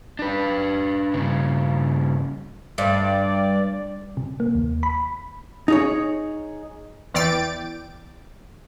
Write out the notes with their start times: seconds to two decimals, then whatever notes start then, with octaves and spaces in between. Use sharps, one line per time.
0.19 D4 B4
1.14 G2 C#3
2.78 G2 D5
4.17 C3
4.40 A#3
4.55 D#2
4.83 B5
5.68 D#4 G#4 C#5
7.14 E2 E3 D5 G5 A6 D7